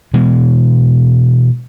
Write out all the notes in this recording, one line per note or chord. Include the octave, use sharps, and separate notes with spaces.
B2 E3 G#3